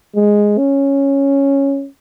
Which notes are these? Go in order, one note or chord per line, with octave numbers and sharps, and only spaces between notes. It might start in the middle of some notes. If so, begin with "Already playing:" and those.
G#3
C#4